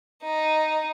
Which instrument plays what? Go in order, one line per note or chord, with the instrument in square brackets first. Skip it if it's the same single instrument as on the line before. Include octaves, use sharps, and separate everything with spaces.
[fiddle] D#4